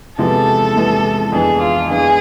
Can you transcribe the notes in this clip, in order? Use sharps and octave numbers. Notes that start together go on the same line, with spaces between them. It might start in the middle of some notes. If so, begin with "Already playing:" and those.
E2 C3 F3 G#3 B3 A4
E2 C3 F3 G#3 B3
F2 E3 B3 D4 G#4
F4
F2 E3 B3 D4 G#4